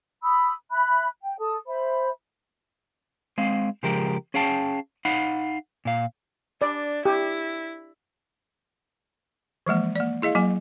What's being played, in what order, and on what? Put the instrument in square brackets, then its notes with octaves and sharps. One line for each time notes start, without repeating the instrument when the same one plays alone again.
[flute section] B5 D#6 E6
E5 B5 F#6
G5
A4 A5 D#6
C5 E5 B5
[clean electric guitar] G#3 C4 F5
C#3 F3 G#3 G4 A#4
C#4 G#4 F5 G5 A5
D#4 F5 F#5 B5
A#2 F5
[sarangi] D4 [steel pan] D5
[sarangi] E4 [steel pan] G4
[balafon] E3 F3 G#3 A#3
A#3 D5
E4 G#4 D#5 F5
F#3 A#3 G#5